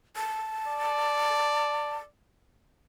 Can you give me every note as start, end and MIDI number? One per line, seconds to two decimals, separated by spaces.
0.16 1.96 81
0.68 2.08 74